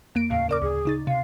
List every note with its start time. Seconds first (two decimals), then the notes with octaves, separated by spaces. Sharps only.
0.15 F2 A#3 D7
0.30 D#2 A2 C#3 F5
0.49 C#3 A#4 D5 D6
0.62 D2 G#4
0.85 C#3 D#4 A6
1.07 C3 F5